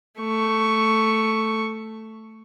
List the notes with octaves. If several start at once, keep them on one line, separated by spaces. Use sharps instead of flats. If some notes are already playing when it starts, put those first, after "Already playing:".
A3 C#6